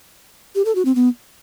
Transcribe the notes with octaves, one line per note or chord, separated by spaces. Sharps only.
G4
A4
F#4
C4
B3